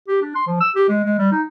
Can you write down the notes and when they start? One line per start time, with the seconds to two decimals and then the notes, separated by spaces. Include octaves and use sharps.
0.08 G4
0.22 D4
0.35 C6
0.47 F3
0.61 E6
0.76 G4
0.89 G#3
1.04 G#3
1.19 G3
1.32 D#4